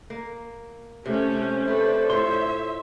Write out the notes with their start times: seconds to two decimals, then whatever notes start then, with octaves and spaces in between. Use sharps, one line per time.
0.10 A#3
1.06 C3 A3 C#4 C5
1.68 A3 D4 A4 B4
2.10 A2 F4 C#5 E5 C6